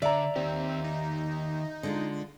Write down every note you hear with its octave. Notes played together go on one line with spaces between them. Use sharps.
D3 D5 E5 A#5
D#3 C4 G4
D#4
D3 G#3 F4